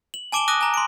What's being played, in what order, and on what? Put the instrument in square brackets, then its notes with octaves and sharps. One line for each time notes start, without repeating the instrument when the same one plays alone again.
[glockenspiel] F#7
G#5 A5 D6 D7 E7 G7
D6 D#6 F#6 A#6 D#7
G#5 A#5
C6 D7